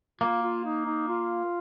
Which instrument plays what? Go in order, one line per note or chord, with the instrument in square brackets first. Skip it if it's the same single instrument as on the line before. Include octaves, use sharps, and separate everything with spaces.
[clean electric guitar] A#3 [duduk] F4
[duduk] F4
D#4
D#4
F4